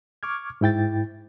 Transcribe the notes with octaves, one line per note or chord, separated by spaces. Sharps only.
C#6 D6 F6 G#6
G#2 E4 G5 A6